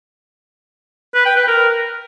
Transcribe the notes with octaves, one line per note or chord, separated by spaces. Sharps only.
B4
G5
B4
A#4